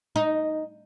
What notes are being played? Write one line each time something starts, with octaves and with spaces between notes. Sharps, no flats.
D#4